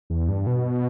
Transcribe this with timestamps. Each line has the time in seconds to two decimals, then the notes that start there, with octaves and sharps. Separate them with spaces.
0.10 E2
0.29 G2
0.47 B2